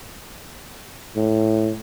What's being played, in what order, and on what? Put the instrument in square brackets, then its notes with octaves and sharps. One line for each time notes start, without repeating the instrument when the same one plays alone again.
[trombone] A2